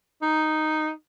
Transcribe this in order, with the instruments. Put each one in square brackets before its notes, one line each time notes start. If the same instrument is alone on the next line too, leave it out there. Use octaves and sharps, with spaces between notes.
[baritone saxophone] D#4